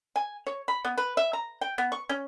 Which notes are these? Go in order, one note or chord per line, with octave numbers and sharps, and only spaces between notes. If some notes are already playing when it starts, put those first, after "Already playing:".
G#5
C#5
B5
B3
B4
E5
A#5
G5
B3
C#6
C#4